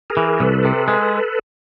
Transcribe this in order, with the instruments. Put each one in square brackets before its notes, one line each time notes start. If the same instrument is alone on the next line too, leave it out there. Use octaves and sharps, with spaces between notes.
[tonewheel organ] G#4 A#4
[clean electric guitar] E3
[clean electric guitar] C2 [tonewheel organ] A4 B4
[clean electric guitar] C3
G#3